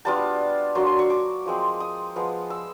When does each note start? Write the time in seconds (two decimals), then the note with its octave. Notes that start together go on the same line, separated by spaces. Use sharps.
0.05 G3 B3 D4 F4 A5
0.75 F#3 A#3 D4 C6
0.87 C6
0.99 C#6
1.10 D6
1.46 F3 G#3 C4
1.80 D#6
2.16 F3 G#3 B3
2.50 E6